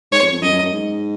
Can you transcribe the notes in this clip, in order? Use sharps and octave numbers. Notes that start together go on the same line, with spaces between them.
G#2 C#5
F2
F2
F#2 D#5
F#2
F#2
G#2